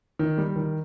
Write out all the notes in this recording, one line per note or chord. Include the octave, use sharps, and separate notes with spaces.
D#3
G3
D#3